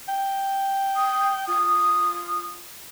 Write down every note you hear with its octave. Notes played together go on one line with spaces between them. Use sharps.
G5
D#6
F4 D#6